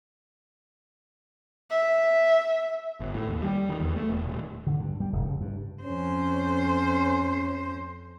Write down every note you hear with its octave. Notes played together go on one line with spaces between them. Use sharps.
E5
G1
A2
D#2
G3
D#3
E2
A3
E1
D#1
D3
G2
G3
F1
C#3
G2
F2 C#4 C5